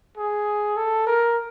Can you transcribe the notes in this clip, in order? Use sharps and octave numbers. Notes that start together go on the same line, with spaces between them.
G#4
A4
A#4